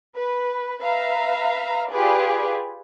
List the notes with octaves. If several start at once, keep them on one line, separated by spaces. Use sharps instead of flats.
B4
B4 E5 F5 A#5
F4 G4 G#4 B4 D5